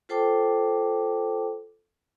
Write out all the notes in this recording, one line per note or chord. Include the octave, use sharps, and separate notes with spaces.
F4 A4 C5 G5 A5 D6